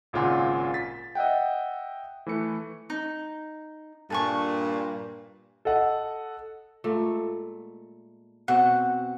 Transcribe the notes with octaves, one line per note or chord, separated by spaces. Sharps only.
G#1 A#2 C#3 F4 F#5 G#5
A6 B6
D#5 E5 F#5 G5
E3 A3 B4 C#7
D#4
G2 A#2 A4 G#5 C#6
A4 D#5 F#5
A#2 G#3 A3
B2 C4 F#4 F#5